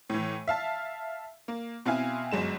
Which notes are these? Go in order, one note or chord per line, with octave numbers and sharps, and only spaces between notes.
A2 E3
E5 F5 A5
A#3
B2 C4 E4 F5 G#5
G1 F#2 G#3 E7